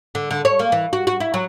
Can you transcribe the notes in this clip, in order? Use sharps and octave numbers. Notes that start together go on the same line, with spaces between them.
D3
D3
C#5
A#3
E3
F#4
F#4
E4
F#3